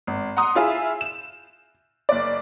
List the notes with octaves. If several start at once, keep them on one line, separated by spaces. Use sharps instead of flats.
G#1
F#5 A#5 C6 D#6
E4 F4 G#4 E5
E7
F#1 D5